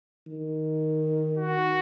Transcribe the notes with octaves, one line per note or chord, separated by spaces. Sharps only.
D#3
F#4